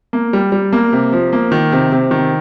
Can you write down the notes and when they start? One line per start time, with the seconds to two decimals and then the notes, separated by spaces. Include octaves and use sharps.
0.13 A#3
0.33 G3
0.52 G3
0.73 A#3
0.92 C3
1.12 F3
1.33 A#3
1.52 D#3
1.72 C3
1.92 C3
2.11 D#3